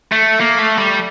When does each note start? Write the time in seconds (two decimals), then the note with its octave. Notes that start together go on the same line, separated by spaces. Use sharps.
0.12 A3
0.40 A#3
0.59 A3
0.78 G3